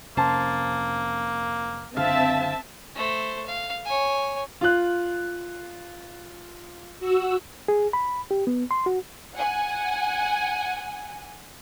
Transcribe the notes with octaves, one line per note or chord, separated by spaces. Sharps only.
F2 C3 A#3 C#4 C5 A5
F#1 D3 C4 E5 F5 A5
A3 C5
F5
C#5 G#5
F4 F#6
F#4 E6
G#4
B5
G4
B3
C6
F#4
F#5 G#5